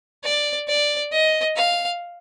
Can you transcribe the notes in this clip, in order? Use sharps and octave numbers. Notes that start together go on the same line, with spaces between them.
D5
D5
D#5
F5